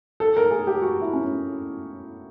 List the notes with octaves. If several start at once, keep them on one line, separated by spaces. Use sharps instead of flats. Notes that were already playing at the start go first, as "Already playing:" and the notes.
A4
A#4
G#4
G4
F#4
E4
C#4